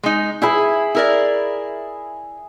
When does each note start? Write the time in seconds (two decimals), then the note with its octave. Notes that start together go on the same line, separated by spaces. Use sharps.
0.03 G#3 D#4
0.42 E4 G#4 E5 B5
0.95 E4 A#4 D5